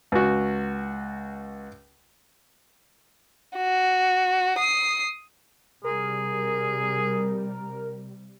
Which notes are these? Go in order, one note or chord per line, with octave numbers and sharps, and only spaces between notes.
C#2 F#4
F#4
D#6 C7
C3 G3 G#4 A#4